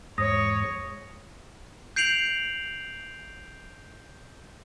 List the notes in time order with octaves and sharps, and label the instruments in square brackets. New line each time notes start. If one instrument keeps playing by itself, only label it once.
[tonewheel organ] E2 G#2 G#3 [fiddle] C#5 [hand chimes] D#6 A#6
[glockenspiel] G6 C7 D7 F7 F#7